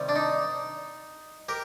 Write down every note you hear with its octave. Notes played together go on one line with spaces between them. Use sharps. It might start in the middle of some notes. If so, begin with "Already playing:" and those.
Already playing: C3 D#3 G3
D4
D#4
G4 A#4